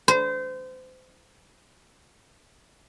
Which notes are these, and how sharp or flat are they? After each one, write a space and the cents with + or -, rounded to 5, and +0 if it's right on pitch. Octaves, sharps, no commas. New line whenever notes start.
C5 -30